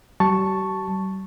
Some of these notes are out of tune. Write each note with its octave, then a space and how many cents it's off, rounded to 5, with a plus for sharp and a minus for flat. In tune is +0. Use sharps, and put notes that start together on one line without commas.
G3 -45 A5 +0 C#6 +0